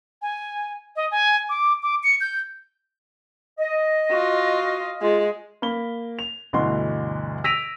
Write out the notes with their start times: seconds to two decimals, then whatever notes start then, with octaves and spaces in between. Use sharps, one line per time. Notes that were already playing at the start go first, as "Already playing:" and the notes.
0.22 G#5
0.96 D#5
1.11 G#5
1.49 D6
1.83 D6
2.04 C#7
2.21 G6
3.58 D#5
4.12 F4 F#4
5.02 G#3 F4
5.62 A#3 B5 G7
6.19 F7
6.53 G1 D2 B2 E3 F#4 C6
7.44 E6 A#6 B6 D7 D#7 F7